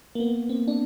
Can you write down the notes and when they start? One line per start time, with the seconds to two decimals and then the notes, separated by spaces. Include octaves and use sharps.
0.15 A#3
0.20 B3
0.49 C4
0.68 D4